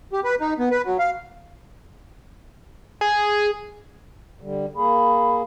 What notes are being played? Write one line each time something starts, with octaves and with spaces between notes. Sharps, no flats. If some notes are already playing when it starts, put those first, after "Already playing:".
G4
B4
D#4
B3
B4
F#3
F5
G#4
D3 G3
A#3 G#4 B5